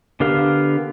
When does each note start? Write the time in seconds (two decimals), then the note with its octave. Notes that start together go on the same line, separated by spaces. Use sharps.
0.20 D3 B3 G4 A#4 F5